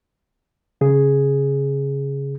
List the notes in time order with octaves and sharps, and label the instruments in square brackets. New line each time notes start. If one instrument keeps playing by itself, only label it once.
[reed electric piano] C#3 G#4